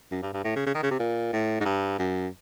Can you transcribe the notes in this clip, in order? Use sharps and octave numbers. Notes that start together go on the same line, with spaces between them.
F#2
G2
G2
A2
C#3
C#3
D#3
C#3
C3
A#2
A2
G#2
G2
F#2